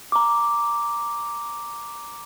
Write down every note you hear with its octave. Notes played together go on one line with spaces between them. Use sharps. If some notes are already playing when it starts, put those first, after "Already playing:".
A#5 D6